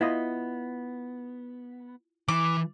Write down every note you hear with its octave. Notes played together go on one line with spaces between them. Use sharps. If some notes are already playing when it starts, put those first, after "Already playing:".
B3 E4 F4 D#5
E3 D6